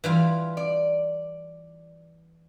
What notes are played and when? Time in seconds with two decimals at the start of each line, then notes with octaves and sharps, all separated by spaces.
0.04 E3 G3 F4
0.57 D5